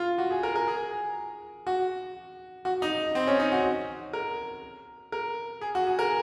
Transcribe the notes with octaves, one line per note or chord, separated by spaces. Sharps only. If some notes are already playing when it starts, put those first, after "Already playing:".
Already playing: F4
F#4
G#4
A#4
A#4
G#4
F#4
F#4
D#4
C4
C#4
D#4
F#4
A#4
A#4
G#4
F#4
G#4
A#4